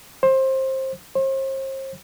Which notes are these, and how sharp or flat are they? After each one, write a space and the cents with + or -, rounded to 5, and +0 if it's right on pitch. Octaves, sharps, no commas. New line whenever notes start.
C5 +20
C5 +40